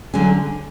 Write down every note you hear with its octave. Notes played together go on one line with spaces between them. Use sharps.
D2 D3 F#3 C#4 G#5